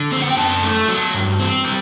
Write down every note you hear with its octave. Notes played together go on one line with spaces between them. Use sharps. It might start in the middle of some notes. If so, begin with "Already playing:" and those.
Already playing: D3
C4
F#5
G5
F#2 A5
A3
F#3
G2
C4
G3